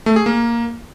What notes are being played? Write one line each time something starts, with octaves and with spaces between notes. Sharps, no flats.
A3
G#4
A#3